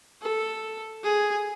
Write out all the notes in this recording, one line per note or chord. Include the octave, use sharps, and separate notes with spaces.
A4
G#4